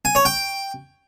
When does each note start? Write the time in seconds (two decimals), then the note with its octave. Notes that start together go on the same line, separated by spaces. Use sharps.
0.05 G#5
0.15 C#5
0.25 G5